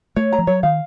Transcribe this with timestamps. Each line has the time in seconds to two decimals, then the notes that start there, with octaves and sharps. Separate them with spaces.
0.16 A3 C#5
0.33 A#5
0.39 F3
0.47 F#3 C#5
0.63 D#3 F5